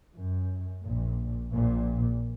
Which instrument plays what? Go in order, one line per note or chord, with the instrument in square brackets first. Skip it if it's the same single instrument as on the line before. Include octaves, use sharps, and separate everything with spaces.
[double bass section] F#2
A#1 A#2
A#1 A#2